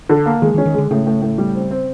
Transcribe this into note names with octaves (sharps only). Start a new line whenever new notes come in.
D3
A#3
D#3 G#3
D#3
C#4
D#3
D3 G#3
A2 C#3
A2
A2
G3
C4
C4